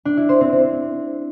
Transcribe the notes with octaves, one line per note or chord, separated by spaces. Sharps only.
D4
E4
C5
C4
C4